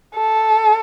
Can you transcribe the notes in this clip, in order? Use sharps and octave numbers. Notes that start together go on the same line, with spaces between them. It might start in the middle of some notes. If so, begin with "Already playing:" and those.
A4